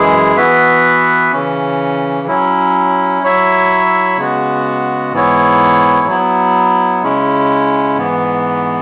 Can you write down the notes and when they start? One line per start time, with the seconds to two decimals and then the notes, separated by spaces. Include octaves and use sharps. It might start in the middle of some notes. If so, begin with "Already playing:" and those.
Already playing: F#2 E3 G#3 E4 G#4
0.37 E3 B3 F#4 B4 E5
1.32 C#3 E3 C#4
2.27 F#3 C#4 E4
3.22 F#3 E4 C#5 E5
4.17 C#3 G#3 B3 F#4
5.13 G#2 E3 B3 E4 C#5
6.07 F#3 B3 E4
7.03 C#3 G#3 C#4 E4
7.97 G#2 E3 B3